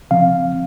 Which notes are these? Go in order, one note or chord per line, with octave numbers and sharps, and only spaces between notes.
C#3 F3 C4 F5